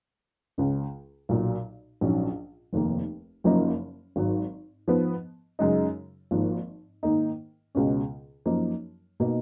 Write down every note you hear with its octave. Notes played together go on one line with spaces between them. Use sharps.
C#2 C#3 G#3 C#4
B1 A#2 F#3
A#1 G#2 F#3 C#4
F1 D#2 D#3 A#3
F#1 F#2 F3 A#3 D#4
G#1 G#2 F#3
G#2 F3 B3
F#2 C#3 G#3 D#4
G#1 G#2 F3 A#3
G#2 D#3 A#3 D#4
C#2 B2 G#3 C#4
F#2 F3 A#3 D#4
B2 A#3 D#4